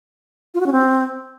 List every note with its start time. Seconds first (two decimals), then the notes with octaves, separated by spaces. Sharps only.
0.54 F4
0.60 F#4
0.66 C#4
0.72 C4